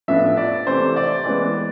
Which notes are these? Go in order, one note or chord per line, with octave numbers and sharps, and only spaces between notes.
A2 F3 B3 D4 E5
D5
C3 E3 A3 C5
D5
E3 G#3 B3